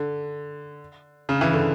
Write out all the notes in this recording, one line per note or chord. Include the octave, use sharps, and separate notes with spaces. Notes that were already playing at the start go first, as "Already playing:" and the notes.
Already playing: D3
C#3
E3
D3